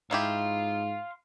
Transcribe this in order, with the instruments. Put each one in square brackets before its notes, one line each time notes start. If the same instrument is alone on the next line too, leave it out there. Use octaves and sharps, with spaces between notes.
[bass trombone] G#2 [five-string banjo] D#4 E4 G4 [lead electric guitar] F5 C6